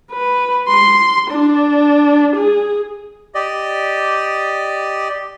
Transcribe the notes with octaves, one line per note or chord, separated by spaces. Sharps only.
B4
C6
D4
G#4
G4 D5 D#5